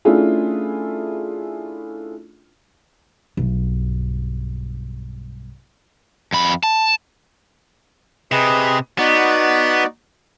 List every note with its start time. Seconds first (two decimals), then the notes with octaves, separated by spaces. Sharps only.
0.05 A3 C#4 D4 E4 F4 G#4
3.37 B1 G2
6.32 F2 B5
6.63 A5
8.32 C3 G#4 B4 D#5
8.98 B3 D#4 F#4 D5